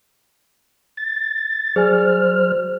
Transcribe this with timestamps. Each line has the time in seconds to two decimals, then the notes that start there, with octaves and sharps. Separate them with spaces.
0.97 A6
1.76 F#3 G#4 C5 D5 G#5 F6